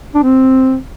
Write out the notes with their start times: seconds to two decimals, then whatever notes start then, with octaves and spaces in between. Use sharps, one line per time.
0.15 D4
0.23 C4